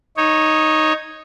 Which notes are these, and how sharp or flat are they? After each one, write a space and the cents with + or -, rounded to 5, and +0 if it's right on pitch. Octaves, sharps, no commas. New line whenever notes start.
D#4 +0 C#5 -10